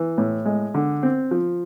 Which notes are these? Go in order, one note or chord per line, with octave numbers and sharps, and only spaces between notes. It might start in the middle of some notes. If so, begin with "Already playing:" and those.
Already playing: E3
A2
G#3
D3
C4
F3